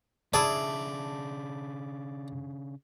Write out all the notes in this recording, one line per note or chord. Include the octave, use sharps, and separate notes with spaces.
C#3 D4 E4 G#4 D5 A5